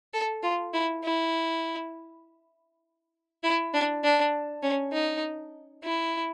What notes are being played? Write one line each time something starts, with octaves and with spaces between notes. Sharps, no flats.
A4
F4
E4
E4
E4
D4
D4
C#4
D#4
E4